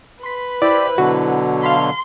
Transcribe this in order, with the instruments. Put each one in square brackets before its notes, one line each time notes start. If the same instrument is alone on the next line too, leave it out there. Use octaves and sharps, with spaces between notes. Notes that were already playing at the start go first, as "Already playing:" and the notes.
[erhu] B4 [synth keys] C6 B6
[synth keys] E4 C5 [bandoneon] G4 B5 [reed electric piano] D5
[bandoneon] B2 D3 F#3 [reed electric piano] F#4
[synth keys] F5 A5 B5 [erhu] C6